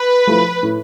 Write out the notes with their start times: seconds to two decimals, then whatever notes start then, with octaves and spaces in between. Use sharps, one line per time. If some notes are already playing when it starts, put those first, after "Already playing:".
Already playing: B4
0.27 F3 A3 E4
0.63 A2